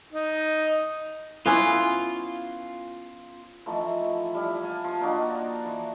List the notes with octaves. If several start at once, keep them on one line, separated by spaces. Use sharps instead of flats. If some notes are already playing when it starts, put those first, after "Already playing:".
D#4
B3 C#4 E4 F4
E3 F3 A3 D#4
G3 E4
F5 G#5 A5
F3 F4
A#3 D4 D#4 F#4
E3